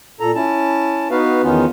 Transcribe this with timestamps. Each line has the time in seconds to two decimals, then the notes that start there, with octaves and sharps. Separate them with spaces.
0.20 A#2 A4 A#5
0.35 C#4 E4 A5
1.11 B3 D#4 F#4 B4 F5
1.43 E2 D#3 B3 C#4 D#4 F4